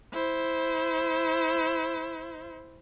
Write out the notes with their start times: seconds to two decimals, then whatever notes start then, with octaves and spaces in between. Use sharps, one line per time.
0.13 E4 C5